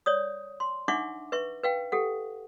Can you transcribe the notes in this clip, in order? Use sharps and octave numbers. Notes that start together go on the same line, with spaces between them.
C#5 D5 D#6
C6
D4 D#4 E5 F#5 C#6 D6
B4 E5 C#6
B4 F5 G5
G4 A4 F#5